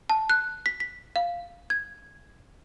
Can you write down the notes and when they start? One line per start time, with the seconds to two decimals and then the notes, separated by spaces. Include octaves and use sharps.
0.10 A5
0.30 F#6
0.66 B6
0.80 B6
1.16 F5
1.70 G#6